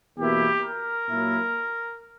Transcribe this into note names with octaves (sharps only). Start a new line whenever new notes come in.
E2 B2 A#3 E4 G4
A#4
A#2 F#3 A#3 E4